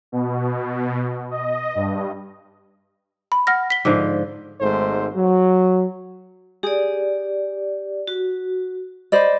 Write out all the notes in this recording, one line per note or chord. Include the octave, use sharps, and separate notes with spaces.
B2
D#5
G2
B5
F#5 F6 A#6
B6 G7
G#2 D3 F3
G#1 G#2 A3 C5
F#3
G4 G#4 D5
F#4
C5 D5 D#5 B5